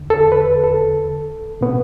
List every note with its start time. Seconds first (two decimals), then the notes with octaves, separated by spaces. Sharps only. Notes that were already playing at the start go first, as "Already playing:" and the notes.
Already playing: E2 D3
0.10 A4
0.32 B4
0.64 A4
1.61 B2 B3